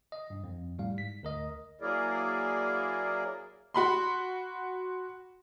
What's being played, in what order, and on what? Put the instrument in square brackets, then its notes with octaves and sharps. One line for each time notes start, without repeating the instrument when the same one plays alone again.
[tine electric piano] D#5
G2
F2
A2 G3 F5
G#2 B6
D2 A#4 D#5
[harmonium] F#3 A#3 E4 G#4 A#4 D5
[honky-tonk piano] F#4 B5 C6